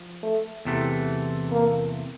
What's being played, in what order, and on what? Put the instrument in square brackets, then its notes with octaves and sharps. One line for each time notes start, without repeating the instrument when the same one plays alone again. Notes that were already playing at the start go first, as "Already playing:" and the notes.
Already playing: [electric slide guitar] F3
[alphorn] A3
[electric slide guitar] E2 C3 E3 A3
[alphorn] A#3